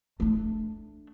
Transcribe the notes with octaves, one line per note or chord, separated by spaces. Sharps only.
A3 D4